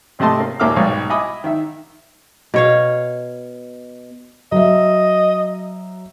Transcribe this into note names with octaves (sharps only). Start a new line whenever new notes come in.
G#1 C3 A3 D#5 A5 C6
A#3
D#2 A#2 A#3 E5 D6 F6
B1 G#2 G3
D#5 E5 G#5 B5 D6 D#6
D#3 E5
B2 C#5 F5
F#3 D#5 E5